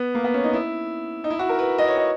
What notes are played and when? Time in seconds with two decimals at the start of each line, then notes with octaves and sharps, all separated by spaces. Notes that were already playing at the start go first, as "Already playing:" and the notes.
Already playing: B3
0.15 A#3
0.24 B3
0.34 C#4
0.44 D#4
0.53 E4
1.24 D#4
1.30 E4
1.39 F#4
1.49 A#4
1.59 B4
1.78 D#5
1.87 C#5
1.97 D#5